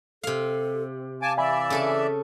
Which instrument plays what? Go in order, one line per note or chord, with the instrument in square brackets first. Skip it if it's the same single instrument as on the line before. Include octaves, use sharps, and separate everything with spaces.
[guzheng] C3 F5 [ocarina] A4
[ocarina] F5 [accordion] G#5 A5 D6
[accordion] E3 D5 E5 [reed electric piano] G#5 B5
[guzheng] C#3 A4 A5